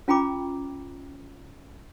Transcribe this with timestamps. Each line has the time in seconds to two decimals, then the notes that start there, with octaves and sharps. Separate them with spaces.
0.08 C#4 F4 G5 A#5 B5 D6